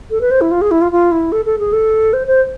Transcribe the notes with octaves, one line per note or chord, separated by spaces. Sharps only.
A4
B4
C5
E4
F4
G#4
E4
F4
F4
E4
A4
A4
G#4
A4
C5
C5